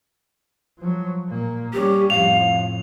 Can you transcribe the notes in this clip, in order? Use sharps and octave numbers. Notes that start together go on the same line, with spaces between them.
F3 F#3
A#2 A#3
G3 C#4 G4
F2 A2 F5 F7